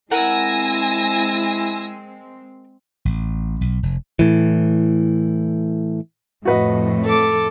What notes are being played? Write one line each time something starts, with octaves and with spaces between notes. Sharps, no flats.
G#3 C4 E4 A#4 F#5 G#5 E6 A#6
A1
B1
F1
A2 E3
F2 A2 F#4 B4 D#5
A4 D6